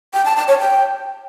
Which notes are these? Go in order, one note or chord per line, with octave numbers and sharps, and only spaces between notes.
G5
A5
A5
C#5
G5